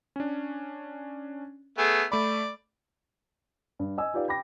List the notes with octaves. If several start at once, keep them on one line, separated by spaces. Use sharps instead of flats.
C#4 D4
A3 B3 G#4
A3 D5 B5
G2
D#5 G#5 E6
D#4 F4 G4 B4 D5 F5
G5 B5 D6 A#6